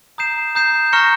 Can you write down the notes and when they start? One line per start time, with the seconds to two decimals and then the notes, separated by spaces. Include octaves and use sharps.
0.18 A#5 D#6 G6 C7 E7
0.55 A#5 D#6 G6 C7 E7
0.93 A#5 C#6 F6 A#6 C#7